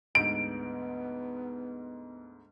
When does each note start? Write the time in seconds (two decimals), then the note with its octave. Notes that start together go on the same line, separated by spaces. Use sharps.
0.15 D2 G#2 B3 D7